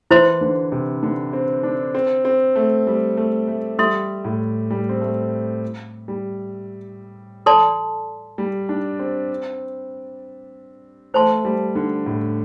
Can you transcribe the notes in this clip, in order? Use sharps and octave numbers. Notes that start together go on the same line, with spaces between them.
E3 E4 C5 E5 C6
D3
C3
D3
C4
D4
C4
C4
A3
G3
A3
A3
G3 A4 E5 C6
A2
G3
C4
A3
G3
A4 D5 A5 C6
G3
D4
C4
A3 C5 A5 C6
G3
D3
A2